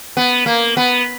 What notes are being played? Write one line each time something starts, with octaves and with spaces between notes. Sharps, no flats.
B3
A#3
B3